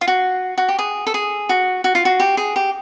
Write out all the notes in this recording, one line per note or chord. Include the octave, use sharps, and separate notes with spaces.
F4
F#4
F#4
G4
G#4
A4
G#4
F#4
F#4
F4
F#4
G4
G#4
G4